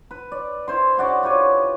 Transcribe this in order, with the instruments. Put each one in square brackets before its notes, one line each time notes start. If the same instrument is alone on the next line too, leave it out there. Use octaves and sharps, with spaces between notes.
[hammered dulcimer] B4
D5
E4 C5 C6
C#3 F#4 D5 D6
F4 G4 B4 C#5